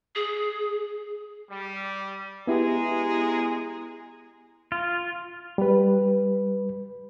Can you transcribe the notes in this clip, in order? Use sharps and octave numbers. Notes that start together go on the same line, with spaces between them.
G#4
G3
G#3 B3 E4 G4 G#4 A#5
F4
G3 B4